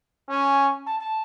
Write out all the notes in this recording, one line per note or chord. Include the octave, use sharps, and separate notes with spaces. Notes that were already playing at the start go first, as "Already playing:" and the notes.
C#4 G#5
A5
A5